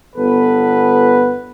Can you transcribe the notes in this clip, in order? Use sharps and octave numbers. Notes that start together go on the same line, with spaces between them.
G1 B3 A4 B4